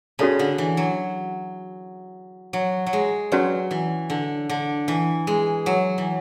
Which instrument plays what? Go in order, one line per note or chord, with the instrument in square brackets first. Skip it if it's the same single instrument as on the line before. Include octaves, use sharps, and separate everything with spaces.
[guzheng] C#3 [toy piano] C#4 F#4 A4 D5 A5
[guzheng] D3
E3
F#3
F#3
F#3
G#3
[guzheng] F#3 [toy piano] C#4 F#4 B4 D5
[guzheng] E3
D3
D3
E3
G#3
F#3
E3